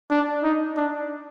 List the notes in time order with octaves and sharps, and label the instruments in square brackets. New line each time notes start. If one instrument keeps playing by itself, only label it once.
[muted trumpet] D4
D#4
D4